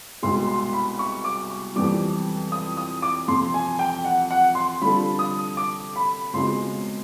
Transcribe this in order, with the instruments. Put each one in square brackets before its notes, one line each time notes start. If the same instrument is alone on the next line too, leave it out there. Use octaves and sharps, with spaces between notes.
[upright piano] C2 B2 G#3 [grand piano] C6
[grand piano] C6
B5
C#6
D6
C#6
[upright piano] F2 C3 E3 G3 C4 [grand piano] D6
[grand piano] D#6
D#6
D6
[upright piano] F2 C3 F3 [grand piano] C6
[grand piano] G#5
G5
F#5
F#5
C6
[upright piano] D3 G3 C4 F4 A4 [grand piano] B5
[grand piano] D#6
D6
B5
[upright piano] C#2 B2 G#3 C4 [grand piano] C6